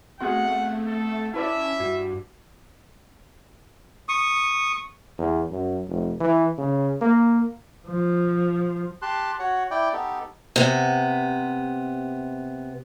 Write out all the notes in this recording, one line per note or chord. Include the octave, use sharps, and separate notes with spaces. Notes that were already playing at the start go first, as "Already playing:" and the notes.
A3 B3 C4 F#4 G#4 F#5 C6
A4
C#4 E4 B4 D5 E5 A5
G2 F#4
C#6 D#6
E2
F#2
F1
E3
C#3
A#3
F3
G4 A5 C6 F#6
F#4 C#5 F#5
E4 D5 G5
B3 D#4 G4 A4
C3 B3